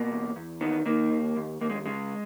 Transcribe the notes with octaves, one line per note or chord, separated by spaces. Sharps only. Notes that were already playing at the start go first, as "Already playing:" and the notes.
Already playing: B2 A#3
E2
E2
D#3 B3
D#3 A#3
D#2
D#2
D#2 A#3
G#3
C#3 G#3